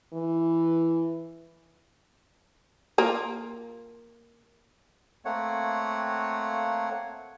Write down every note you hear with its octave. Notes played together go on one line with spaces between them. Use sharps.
E3
A#3 F4
A3 A#3 C4 C#5 F#5